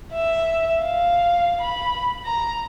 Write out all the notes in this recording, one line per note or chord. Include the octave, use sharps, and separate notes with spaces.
E5
F5
B5
A#5